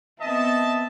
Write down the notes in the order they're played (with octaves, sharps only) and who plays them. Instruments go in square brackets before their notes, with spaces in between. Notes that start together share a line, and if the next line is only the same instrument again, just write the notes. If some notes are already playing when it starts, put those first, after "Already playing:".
[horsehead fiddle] B3 C4 [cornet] D#5 [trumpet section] E5 A5